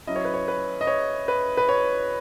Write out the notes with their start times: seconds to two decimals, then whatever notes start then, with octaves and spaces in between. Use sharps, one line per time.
0.07 F#3 C#4 E4 D#5
0.16 C#5
0.25 B4
0.34 C#5
0.48 B4
0.81 D#5
0.87 C#5
1.28 B4
1.57 B4
1.69 C#5